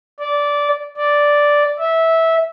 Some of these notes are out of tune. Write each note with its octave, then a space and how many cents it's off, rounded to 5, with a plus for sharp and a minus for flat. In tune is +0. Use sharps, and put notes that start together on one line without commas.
D5 -15
D5 -5
E5 -15